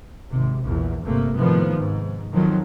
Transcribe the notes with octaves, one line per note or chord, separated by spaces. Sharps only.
G#1 C3
A#1 E2
G1 C3 A3 A#3
A2 C3 D#3 F3 B3
G#2
F2 D#3 F3 F#3